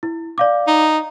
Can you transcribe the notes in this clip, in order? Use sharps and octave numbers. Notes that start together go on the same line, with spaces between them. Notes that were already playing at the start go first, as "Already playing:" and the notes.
E4
D5 F5 D6
D#4